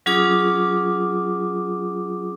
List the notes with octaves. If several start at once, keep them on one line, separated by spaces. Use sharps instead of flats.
F#3 C#4 F4 G#4 D6 D#6